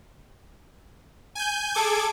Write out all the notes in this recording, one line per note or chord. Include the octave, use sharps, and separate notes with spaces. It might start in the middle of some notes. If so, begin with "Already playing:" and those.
G#5 G6
G#4 A4 D6 G#6